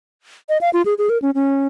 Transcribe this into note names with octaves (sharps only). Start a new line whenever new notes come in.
D#5
F5
F4
G#4
G#4
A#4
C#4
C#4